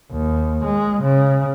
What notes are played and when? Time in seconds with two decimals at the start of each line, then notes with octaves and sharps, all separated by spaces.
0.12 D#2
0.65 G#3
1.02 C#3